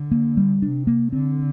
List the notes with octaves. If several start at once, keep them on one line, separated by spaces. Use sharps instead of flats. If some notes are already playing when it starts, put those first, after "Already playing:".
Already playing: D3
A#3
G3
C3 D4
A#3
D3 C4